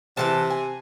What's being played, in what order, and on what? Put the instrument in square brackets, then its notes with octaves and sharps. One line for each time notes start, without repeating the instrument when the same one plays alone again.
[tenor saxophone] C3 [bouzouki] E3 G#3 A5
[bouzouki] G#5